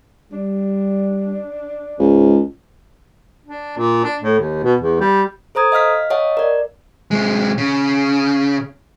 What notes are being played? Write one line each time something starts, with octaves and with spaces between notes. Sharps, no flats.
G3 D4
C#2 G#2
D4
A#2
D4
A2
D#2
B2
E2
G3
A4 C5 A#5 D#6 G#6
D#5 F5 F6 B6
C#5 D#5 F5 F#5 A5
A#4 D5
C3 G#3
C#3